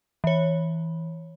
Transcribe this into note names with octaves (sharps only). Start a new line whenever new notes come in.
E3 C#5